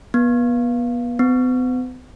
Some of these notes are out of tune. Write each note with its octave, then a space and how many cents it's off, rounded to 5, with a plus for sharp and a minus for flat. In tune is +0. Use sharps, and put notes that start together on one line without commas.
B3 -30
B3 +45